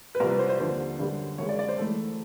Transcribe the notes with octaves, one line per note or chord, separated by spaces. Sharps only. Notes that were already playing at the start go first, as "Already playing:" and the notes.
B4
C2 C3 F3 A#4
B4
C5
C5
D#2 D3 F3 C5
F#2 D3 G3
F#2 D#3 G#3 C#5
D5
D5
C5
G#2 E3 A3 A4